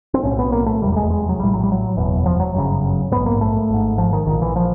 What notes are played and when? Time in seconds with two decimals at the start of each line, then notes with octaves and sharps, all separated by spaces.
0.14 C4
0.23 B1 A2 C#4
0.39 B3
0.52 A#3
0.66 A3
0.81 F1 E2 C3 G3
0.92 G3
0.96 G#3
1.10 G#3
1.29 F#3
1.38 A#1 A2 G3
1.54 F#3
1.63 G3
1.72 F#3
1.96 F#1 E2 B2
2.26 F3
2.40 F#3
2.54 G1 F#2 C#3 F#3
3.11 A#1 G#2 B3
3.26 A#3
3.41 A3
3.69 G#1 G#2
3.98 F3
4.13 D#3
4.26 A#1 A#2 D#3
4.42 E3
4.56 F3